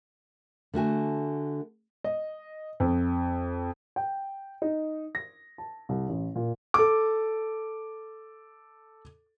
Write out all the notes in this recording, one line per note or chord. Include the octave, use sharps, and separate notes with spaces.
D3 A3 F#4 G#5
D#5
F2
G5
D#4
A#6
A5
C2
A1
A#2
A4 D6